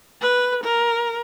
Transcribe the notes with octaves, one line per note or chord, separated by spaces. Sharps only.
B4
A#4